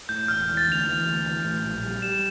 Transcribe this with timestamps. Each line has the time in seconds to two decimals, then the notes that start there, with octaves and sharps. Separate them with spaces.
0.09 A2 G6
0.28 E1 F6
0.48 E3
0.57 A6
0.67 D2 F7
0.86 E3 F7
1.06 D2
1.25 E3
1.44 A2
1.64 A#1
1.83 G3
2.02 G3 E7